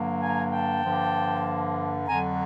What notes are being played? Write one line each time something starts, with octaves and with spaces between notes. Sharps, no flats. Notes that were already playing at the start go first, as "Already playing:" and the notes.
Already playing: G2 D3 F#3 A#3
G#5 A#5
G5 A5
G2 D3 F3 A#3
F2 D3 F#3 G#5 A#5